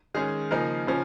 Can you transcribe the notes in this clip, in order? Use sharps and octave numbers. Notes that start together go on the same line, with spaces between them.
D#3 G#3 C#4 G#4
C#3 F3 A#3 D#4 A#4
C#3 F3 C#4